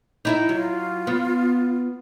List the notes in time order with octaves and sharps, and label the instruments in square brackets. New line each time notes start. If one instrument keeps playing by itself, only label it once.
[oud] D#4 E4 E5
[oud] F#3 [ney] F4
[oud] B3